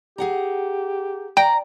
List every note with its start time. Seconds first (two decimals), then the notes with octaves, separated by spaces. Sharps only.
0.18 G4 G#4 F#5 A#5
1.37 D5 G5 A#5